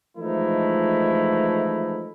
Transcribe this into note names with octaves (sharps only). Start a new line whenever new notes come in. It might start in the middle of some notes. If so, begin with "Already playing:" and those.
E3 F3 G#3 A3 D#4 E4